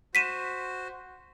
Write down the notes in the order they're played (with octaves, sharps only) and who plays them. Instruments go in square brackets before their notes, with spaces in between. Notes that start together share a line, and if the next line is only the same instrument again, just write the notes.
[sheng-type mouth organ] F#4 C5 [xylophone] B6 D#7 E7